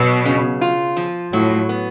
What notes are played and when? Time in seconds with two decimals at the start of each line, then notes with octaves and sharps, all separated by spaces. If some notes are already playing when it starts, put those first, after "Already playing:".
Already playing: B2 F#3
0.25 C#3
0.61 F4
0.97 F3
1.33 A2 F#3
1.69 B3